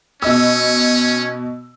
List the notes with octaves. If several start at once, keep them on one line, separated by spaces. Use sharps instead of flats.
B2 C#4 D#5 E6